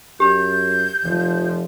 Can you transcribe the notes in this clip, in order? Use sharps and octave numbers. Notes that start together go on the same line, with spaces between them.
F#2 G4 B5 G6
F1 F3